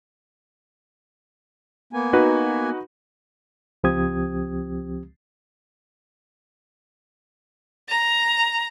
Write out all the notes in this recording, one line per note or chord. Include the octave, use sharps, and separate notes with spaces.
A#3 B3 G#5
D#4 F#4 B4
C#2 F3 C4 G4 D#6 G#6
A#5